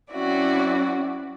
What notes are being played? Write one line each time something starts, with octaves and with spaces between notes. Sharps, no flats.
F#3 C4 C#4 E4 F#4 D5